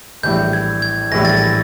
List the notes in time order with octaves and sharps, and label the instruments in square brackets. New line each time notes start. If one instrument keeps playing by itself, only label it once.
[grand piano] A#1 A2 E3 G3 [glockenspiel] G6
[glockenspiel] G#6
G#6
[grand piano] A#1 A2 E3 G3 [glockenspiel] A#6
[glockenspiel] A6
A#6